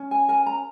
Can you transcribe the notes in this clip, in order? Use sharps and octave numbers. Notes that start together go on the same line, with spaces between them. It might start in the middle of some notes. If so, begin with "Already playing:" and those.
Already playing: C#4
G#5
A#4 G#5
A#5